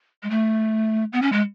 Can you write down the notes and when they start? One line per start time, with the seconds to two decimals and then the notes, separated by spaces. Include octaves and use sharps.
0.23 G#3
0.30 A3
1.13 B3
1.22 C#4
1.32 G#3